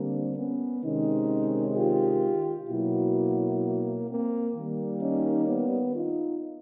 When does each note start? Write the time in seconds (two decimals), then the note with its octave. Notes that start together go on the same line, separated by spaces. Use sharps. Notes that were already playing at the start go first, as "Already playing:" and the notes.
Already playing: D3 G3 A#3 C4 D4
0.37 B3 C#4
0.84 C3 D#3 G#3 C#4 D#4
1.77 F4 G4
2.69 B2 F#3 A#3 E4 F#4
4.09 A#3 C4
4.55 D#3 G3 A#3
5.02 C#4 D#4
5.48 B3
5.95 D#4 F4